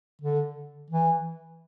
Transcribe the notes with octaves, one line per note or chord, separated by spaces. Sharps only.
D3
E3